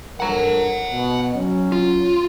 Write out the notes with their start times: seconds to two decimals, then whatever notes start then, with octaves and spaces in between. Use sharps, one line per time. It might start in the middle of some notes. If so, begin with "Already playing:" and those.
0.20 G2 A4 A#4 F#5 A#5
0.92 B2
1.34 F#3 C#4
1.72 F4